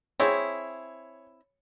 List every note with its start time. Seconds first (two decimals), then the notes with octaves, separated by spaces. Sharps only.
0.20 C4 E4 G#4 C#5